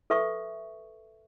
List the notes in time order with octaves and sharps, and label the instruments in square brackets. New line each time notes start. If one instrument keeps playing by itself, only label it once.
[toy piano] A4 B4 E5 C#6